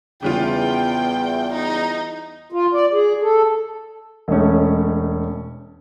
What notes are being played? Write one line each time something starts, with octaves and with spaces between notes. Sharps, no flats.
E2 C#3 G3 F4 G5
D#4
F4
D5
G#4
A4
E1 G#3 A3 C#4